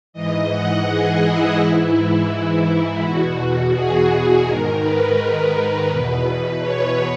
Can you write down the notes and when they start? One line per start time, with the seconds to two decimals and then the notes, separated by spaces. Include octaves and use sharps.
0.13 G#2 E3 D#5
0.49 F#5
0.86 G#4
1.21 E4
1.58 G#2 E3
3.01 E2 B2 F#4
3.73 G#4
4.45 G#2 D#3 A#4
4.80 B4
5.89 E2 B2
6.60 C#5